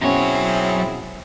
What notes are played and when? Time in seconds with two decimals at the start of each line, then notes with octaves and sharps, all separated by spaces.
0.02 F#2 B2 C4 C#4 E4 G#4 C#5